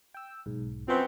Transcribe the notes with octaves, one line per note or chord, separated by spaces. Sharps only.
G5 E6
B1 G#2
F#2 F3 B3 C4 C5